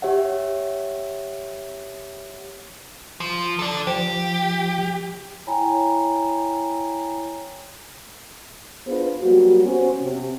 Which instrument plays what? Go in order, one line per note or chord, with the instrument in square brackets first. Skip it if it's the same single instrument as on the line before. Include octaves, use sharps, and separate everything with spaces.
[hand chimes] G4 C#5 E5 F#5
[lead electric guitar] F3
A4 D5
[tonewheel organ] F3 [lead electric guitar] G4
[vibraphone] E4 C#5 G5 G#5 A#5 B5
[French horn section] B3 D4 F4 G#4 B4 C5
F#3 G3 A#3 F#4
B3 C#4 F#4 C5
C3